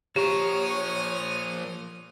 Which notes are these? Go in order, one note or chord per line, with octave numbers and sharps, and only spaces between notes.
F3 G4 A#4 C#5 D#6 F6